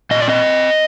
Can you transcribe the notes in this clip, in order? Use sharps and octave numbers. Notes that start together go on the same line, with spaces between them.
A#2 D#5
D5
C4 D#5